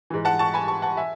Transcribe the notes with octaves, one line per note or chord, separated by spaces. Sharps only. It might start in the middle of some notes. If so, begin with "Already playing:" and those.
G#2 E3
F#5 A5
A5 C#6
G#5 B5
A5 C#6
F#5 A5
E5 G#5